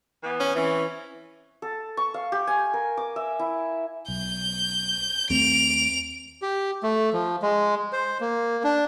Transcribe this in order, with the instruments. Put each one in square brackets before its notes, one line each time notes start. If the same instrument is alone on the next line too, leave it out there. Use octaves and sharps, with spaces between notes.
[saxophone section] E3 B3
[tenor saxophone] C#4
[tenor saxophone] E3 [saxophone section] C4 C#4
[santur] A4
C#6
F5
G4
G#5
A#4
D6
E5
E4
[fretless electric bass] B1 [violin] G6
[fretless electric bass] D#2 A3 C4 [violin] D7 F7
[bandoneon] G4
A3
F3
G#3
C5
A#3
D4